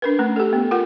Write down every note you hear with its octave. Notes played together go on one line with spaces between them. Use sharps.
D4 A#4 B4
A3 C#4
G4 A4
B3
F4 A#4 F#5